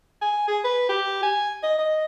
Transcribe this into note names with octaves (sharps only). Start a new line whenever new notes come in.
G#5
G#4
B4
G4
G#5
D#5
D#5